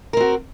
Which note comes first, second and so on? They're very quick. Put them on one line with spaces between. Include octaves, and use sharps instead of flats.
A#4 C4 F#4